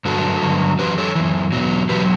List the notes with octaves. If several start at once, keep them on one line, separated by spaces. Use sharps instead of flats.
G2 D3 F#3 F#4 A4
G2 D3 F#3
F#2 E3 G4 B4
A4 C#5
F#2 E3
E2 B2 F#3
E2 B2 F#3 G4 B4